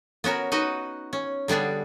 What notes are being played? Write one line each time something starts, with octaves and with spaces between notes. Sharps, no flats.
B3 C#4 F#4 A#4
D#4 F#4 B4 D#5
C#4
D3 G3 B3 D4 G#4